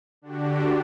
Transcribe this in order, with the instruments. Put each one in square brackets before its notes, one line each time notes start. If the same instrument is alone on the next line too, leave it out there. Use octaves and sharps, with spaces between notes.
[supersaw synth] D3 D4 F#4 G4